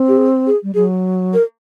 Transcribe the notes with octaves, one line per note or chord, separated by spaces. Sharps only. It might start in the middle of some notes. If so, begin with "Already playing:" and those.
Already playing: C4
G4
G#4
G#4
G3
F#3 G#4
A#4